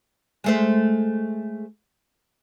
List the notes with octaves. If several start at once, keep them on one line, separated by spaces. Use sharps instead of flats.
G#3 A3 C5